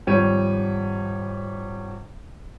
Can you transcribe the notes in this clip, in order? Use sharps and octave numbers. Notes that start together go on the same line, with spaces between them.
G#1 F3 G3 C#5 G6 D#7